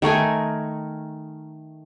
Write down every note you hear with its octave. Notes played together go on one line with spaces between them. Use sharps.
D#3 A3 A#4 G#5